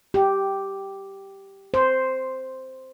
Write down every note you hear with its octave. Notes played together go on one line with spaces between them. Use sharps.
G4
C5